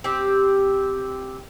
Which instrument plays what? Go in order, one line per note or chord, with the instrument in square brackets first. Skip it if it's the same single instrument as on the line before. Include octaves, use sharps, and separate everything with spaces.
[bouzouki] C4 G4